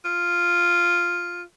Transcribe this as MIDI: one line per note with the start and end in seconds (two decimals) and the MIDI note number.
0.05 1.42 65